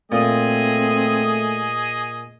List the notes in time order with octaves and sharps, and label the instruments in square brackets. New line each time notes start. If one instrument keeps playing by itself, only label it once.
[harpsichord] A#2 [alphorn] A3 [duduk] C4 [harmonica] G#4 D#5